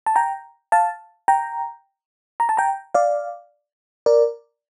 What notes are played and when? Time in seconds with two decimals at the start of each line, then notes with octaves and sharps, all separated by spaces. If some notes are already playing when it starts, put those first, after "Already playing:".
0.06 A5
0.16 G5 A#5
0.72 F5 A5
1.28 G5 A#5
2.40 A#5
2.49 A5
2.57 G5 A#5
2.94 D5 F5
4.06 A#4 D5